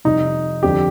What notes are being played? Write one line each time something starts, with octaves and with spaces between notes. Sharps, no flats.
F2 C3 G3 D#4
F2 D3 G3 G4